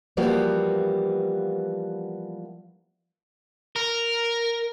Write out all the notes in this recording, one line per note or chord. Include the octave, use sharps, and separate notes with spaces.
E3 F3 G3 A#3 B3 F#4
A#4